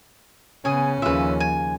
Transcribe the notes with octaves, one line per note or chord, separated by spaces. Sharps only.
C#3 B3 C#4 G#4 G#5
D#2 C#3 F3 F4 B4 E5
G#5